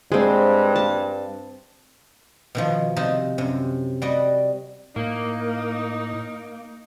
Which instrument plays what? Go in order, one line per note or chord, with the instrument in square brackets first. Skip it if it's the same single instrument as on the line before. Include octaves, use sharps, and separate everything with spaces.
[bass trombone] G2 [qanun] G#3 C4
[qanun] A5
[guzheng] B2 D#3 F3
C3 F3 D#4
F#2 C3
G3 F#4 D5 D#5
[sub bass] A2 [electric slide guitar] A#3 [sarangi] D#4